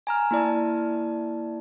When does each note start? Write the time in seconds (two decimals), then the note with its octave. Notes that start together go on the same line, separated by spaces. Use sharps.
0.07 G#5 A#5 F6
0.31 A#3 E4 D5 A5